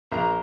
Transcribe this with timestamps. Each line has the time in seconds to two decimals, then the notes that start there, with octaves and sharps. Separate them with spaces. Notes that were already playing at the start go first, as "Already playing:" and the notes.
0.12 A#1 A#5